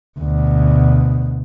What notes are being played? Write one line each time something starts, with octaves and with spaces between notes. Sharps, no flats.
D2 B2